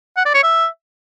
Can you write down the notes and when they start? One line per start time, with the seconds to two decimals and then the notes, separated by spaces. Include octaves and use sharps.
0.17 F#5
0.26 D5
0.34 C#5
0.43 E5